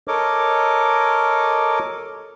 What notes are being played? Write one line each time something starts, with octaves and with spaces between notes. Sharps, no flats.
A4 A#4 C#5 D#5 D6